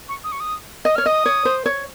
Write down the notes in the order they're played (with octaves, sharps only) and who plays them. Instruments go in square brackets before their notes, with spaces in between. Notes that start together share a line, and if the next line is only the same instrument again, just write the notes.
[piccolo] C#6
D#6
C#6
D#6
[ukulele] D#5 [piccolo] D#6
[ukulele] C#5 [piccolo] F6
[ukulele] D#5 [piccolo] D#6
[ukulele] C#5
C5
C#5